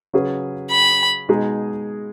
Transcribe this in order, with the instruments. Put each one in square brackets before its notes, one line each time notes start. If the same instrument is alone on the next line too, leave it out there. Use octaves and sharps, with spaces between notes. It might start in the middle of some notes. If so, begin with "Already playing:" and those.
[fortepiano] C#3 F#3 C#4 G#4 B4
[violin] B5
[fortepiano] B2 G#3 D#4 G#4